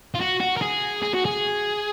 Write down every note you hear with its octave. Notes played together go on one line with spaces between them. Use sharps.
F4
F#4
F#4
A#4
G#4
G#4
F#4
G#4